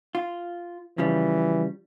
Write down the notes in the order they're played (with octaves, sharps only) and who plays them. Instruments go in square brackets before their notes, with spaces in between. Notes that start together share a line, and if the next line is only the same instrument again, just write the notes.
[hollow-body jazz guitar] F4
[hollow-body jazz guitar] C#3 F3 G3 [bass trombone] E3